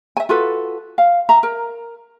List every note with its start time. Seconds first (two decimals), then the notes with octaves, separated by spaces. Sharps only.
0.17 E5 G#5
0.29 F4 F#4 A4 B4
0.98 F5
1.29 E5 A#5
1.43 A#4